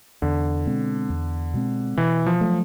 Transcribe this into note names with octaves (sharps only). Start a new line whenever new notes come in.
E2 D3
B2 G#3 C4
E2
B2 G#3 C4
B2 E3
F3
F#3 A3